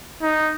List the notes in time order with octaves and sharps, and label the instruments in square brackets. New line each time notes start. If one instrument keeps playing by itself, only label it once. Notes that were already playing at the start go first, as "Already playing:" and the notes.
[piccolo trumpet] D#4